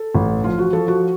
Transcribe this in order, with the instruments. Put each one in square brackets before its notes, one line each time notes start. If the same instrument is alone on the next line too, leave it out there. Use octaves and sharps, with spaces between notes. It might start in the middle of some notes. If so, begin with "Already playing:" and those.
Already playing: [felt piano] A4
A1
F3 F4
F#4
F3 A4
F#4